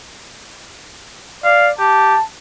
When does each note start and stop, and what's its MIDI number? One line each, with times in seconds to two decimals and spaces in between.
1.44 1.72 74
1.44 1.68 77
1.79 2.15 67
1.79 2.24 81